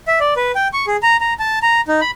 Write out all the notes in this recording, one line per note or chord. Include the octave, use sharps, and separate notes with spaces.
E5
D5
B4
G5
C#6
G#4
A#5
A#5
A5
A#5
D#4
B5